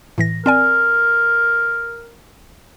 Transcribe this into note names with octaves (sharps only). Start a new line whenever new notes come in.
A2 E3 A#6
C4 A#4 D5 G#5